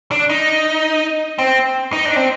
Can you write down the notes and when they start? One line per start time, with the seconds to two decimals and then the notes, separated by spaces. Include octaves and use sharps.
0.11 D4
0.30 D#4
1.38 C4
1.92 D#4
2.05 D4
2.16 C4